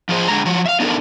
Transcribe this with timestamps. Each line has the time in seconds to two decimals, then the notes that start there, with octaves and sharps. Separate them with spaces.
0.09 F3 F4 G#4 C5
0.28 D3 G#3 A#5
0.46 F3 F#3 C#5
0.66 E5 F5
0.80 B3 D4 D#4 G4 A4 A#4